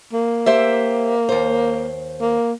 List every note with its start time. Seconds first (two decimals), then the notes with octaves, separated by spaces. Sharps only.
0.13 A#3
0.46 G4 C5 E5
1.29 D#2 C5
2.21 A#3